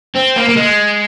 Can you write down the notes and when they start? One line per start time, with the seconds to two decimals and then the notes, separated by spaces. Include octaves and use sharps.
0.15 C4
0.36 A#3
0.48 A#3
0.56 G#3